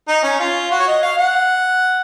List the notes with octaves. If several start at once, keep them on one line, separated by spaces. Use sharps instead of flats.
D#4
C#4
F4
F#4
C#5
D#5
F5
F#5